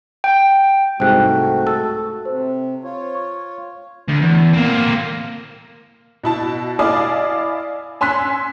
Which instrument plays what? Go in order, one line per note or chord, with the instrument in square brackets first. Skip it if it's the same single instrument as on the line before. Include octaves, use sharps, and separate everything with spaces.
[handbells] G5
[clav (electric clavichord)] C2 G#2 [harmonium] A3 F#4 [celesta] C5 G5 F#6
[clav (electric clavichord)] A4 [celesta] E6
[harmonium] C3 [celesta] C5
[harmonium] F4 C#5
[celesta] C#6
[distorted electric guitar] D2
E2
A#3 C4
[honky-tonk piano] B2 E4 A5
E4 D5 D#5 F5 G#5 D6
C#4 G#5 C6 E6 F#6 B6